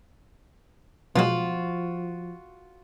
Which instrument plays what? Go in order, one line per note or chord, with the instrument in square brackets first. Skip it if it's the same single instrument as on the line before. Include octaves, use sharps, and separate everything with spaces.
[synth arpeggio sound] B2 F#3 G#3 [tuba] F3 [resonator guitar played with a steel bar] F4 F#4